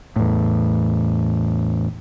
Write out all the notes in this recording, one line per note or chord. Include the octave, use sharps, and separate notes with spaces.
E2 A2